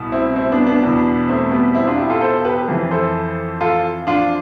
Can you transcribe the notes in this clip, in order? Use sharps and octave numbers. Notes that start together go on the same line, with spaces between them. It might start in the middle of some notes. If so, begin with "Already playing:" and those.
Already playing: C2 B2
C4 E4
C4 E4
B3 D4
B3 D4
E2 B2
A3 C4
G3 B3
C4 E4
D4 F4
E4 G4
F4 A4
A4 C5
G4 B4
F2 E3
A4 C5
F4 A4
D4 F4